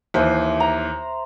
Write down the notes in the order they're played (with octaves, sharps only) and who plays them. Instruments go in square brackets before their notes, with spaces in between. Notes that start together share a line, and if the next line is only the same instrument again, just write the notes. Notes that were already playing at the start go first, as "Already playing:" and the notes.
[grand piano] D#2 E3 [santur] C5 E5
[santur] A#5